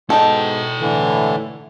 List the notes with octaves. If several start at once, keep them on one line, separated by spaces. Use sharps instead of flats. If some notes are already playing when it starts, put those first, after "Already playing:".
G#2 B2 D#4 E4 A4 G5
A2 D3 E3